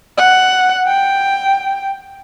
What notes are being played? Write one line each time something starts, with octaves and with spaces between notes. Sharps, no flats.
F#5
G5